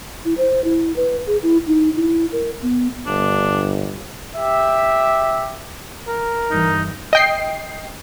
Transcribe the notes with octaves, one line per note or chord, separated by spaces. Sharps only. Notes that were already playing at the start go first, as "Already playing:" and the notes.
E4
C5
E4
B4
G#4
E4
D#4
E4
A#4
B3
G1 D4
G4 E5
A#4
G1 G2 E3 D#4
D#5 G5 C7